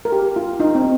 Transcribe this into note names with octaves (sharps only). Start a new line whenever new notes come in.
A#4
G4
F4
D#4
C4